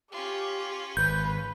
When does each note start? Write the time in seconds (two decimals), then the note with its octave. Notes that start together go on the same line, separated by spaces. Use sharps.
0.12 C#4 F4 G4
0.97 G#1 B4 G6